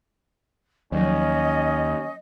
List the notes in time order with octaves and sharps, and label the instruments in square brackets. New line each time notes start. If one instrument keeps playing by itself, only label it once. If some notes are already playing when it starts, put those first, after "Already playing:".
[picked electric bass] D#2 [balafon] F3 F#3 [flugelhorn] C#4 [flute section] D#5